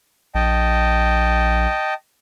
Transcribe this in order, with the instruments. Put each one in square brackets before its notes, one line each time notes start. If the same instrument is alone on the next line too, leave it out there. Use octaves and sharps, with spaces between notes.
[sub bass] A#1 [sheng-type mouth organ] D#5 G5 A5